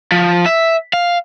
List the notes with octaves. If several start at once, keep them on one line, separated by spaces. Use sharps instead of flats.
F3
E5
F5